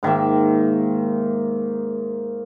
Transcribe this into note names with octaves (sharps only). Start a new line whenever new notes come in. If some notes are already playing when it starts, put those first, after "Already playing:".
G#2 D#3 A#3 E5